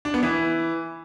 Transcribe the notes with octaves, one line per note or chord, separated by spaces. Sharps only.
D4
B3
E3